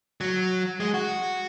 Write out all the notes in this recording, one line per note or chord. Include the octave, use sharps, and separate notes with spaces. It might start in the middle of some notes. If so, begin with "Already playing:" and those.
F#3
G#3
F#4